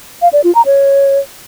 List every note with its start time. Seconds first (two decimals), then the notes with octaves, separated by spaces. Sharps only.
0.22 F5
0.33 D5
0.44 F4
0.55 A#5
0.66 C#5